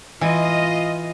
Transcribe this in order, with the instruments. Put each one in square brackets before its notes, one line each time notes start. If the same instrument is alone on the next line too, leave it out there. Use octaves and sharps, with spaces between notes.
[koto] E3 [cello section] F4 D#5